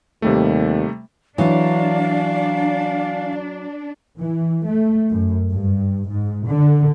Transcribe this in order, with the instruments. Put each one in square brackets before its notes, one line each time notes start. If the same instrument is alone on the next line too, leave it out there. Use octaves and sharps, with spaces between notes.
[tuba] D#2 [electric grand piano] C3 G3 A3
[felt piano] E3 [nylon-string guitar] F#3 [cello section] D4 [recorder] F5
[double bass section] E3
A3
F#2
G2
G#2
D3